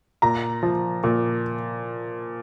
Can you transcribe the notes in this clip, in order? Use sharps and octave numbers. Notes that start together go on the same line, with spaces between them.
A#2 A#5
F3
A#2